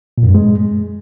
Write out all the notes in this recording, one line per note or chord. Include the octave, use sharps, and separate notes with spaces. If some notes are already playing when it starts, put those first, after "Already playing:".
A#2
F#2
G2
G#3